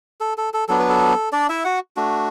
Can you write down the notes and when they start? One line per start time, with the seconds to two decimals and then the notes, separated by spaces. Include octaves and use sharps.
0.21 A4
0.38 A4
0.54 A4
0.68 F#3 B3 D4 A4
0.79 B4
0.89 A4
1.32 D4 D5
1.49 E4 E5
1.64 F#4 F#5
1.96 A3 D4 F#4